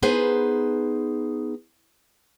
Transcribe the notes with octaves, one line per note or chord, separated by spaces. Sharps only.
B3 D#4 G#4 B4 C5